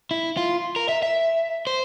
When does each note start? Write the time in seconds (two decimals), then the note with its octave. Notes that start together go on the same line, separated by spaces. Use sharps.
0.11 E4
0.37 F4
0.76 A#4
0.89 E5
1.03 E5
1.67 C5